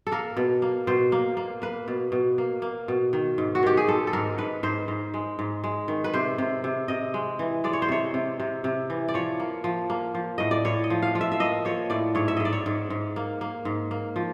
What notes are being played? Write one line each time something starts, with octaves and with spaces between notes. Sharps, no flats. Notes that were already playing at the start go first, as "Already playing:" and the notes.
A4
A#3 A#4
B2
A#3
B2 C5
A#3
A#3
A#3 B4
B2
B2
A#3
A#3
B2
D#3
G#2
F#4
D#3 G4
G#4
G#3 A4
A4
G#2 A#4
G#2 B4
G#2 C5
G#2
G#3
G#2
G#3
D#3
B4
C3 C5
C3
C3
C3 D#5
G#3
E3
G#3 D5
C#5
C5
C3 C#5
C3
C3
C3
E3
D5
F3 C#5
A#3
F3
A#3
F3
A2 D#5
D5
A2 C#5
D#5
F3
F5
F3
E5
E5
A#3 D#5
F3 C#5
A2 D5
G#2 C#5
E5
G#2 D#5
D5
C#5
G#2
G#2
A#3
A#3
G#2
A#3
F3